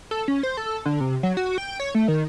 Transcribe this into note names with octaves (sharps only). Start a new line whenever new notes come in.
A4
C#4
C5
A4
D3
C3
F#3
F#4
G5
C#5
A3
D#3